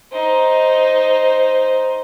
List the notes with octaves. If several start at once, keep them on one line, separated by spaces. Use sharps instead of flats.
D#4 C5